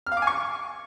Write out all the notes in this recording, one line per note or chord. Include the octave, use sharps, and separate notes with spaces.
F6
F5
D6
G#5
C#6